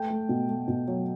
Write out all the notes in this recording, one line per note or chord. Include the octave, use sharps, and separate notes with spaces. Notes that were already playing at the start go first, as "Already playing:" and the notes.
Already playing: A3 G5
A3
B2
A3
B2
F#3